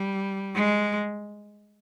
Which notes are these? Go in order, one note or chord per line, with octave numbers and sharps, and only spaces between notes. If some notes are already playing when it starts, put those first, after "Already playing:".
Already playing: G3
G#3